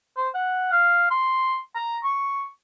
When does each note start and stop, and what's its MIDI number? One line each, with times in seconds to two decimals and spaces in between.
0.17 0.29 72
0.34 0.69 78
0.72 1.07 77
1.11 1.58 84
1.75 1.97 82
2.03 2.46 85